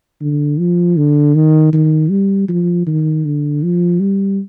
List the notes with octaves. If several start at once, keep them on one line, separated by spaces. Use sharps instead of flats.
D3
F3
D3
D#3
D#3
G3
F3
D#3
D3
F3
G3